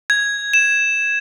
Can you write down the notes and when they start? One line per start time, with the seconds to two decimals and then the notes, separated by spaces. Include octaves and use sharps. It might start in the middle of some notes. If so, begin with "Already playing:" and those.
0.10 G#6
0.54 E7